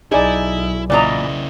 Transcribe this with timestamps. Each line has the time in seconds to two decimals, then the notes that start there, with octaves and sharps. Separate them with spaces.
0.12 B1 D#4 E4 G#4 D5
0.90 A#2 C#3 E3 E4 D5 D#5 A#5